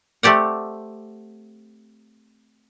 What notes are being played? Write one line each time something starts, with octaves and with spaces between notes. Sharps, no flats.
A3 C4 G4 D5 F#5